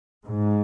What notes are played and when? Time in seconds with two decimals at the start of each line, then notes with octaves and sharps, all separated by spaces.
0.24 G#2